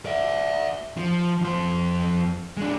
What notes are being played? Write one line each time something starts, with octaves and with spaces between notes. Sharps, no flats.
D5 E5
F3
F2 C5
G#3 D4